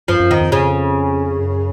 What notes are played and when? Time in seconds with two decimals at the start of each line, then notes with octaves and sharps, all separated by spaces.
0.08 F#2 F3
0.20 F#2
0.31 F2 D#3
0.41 F2
0.52 C#3
1.38 F#2